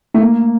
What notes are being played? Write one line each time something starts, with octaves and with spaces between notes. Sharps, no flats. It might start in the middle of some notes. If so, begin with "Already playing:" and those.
A3
A#3